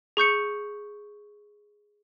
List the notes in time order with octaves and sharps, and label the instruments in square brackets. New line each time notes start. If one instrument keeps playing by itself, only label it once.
[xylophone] G#4 C#6 G6 C#7